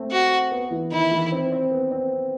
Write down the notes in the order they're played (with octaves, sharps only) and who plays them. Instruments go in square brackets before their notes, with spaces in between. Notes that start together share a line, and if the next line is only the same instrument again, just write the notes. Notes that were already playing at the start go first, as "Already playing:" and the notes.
Already playing: [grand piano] A3 C4
[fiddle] F#4
[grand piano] B3
E3
[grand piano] D#3 [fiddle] E4
[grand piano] E3
C4
C4
B3
C4